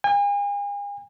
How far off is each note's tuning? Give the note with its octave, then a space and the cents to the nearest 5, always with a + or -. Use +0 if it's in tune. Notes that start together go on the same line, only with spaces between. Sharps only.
G#5 -40